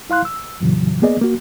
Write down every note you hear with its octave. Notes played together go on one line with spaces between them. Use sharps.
E4 F5 C6 F#6
E6
F2 A#2 C#3 E3 F#3
A#3 B3 G#4 D5 D#5
A#3 F#4